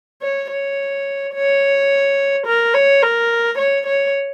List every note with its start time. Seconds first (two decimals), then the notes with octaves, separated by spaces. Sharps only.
0.22 C#5
0.51 C#5
1.35 C#5
2.46 A#4
2.74 C#5
3.02 A#4
3.58 C#5
3.87 C#5